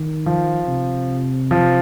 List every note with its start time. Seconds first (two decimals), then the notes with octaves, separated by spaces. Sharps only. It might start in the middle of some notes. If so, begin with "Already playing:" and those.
Already playing: D#3
0.26 F3
0.68 C3
1.51 F3